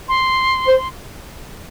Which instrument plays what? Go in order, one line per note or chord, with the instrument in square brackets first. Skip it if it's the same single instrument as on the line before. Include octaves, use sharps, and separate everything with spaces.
[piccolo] C6
[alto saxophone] C5